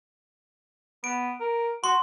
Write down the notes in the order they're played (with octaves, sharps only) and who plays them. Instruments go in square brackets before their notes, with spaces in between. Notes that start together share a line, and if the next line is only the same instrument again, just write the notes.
[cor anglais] B3 [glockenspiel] D7
[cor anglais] A#4
[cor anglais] F#4 [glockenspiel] C6